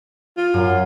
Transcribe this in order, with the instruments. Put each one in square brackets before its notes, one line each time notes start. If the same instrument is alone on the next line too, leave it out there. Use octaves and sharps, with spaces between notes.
[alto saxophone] F4
[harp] F#2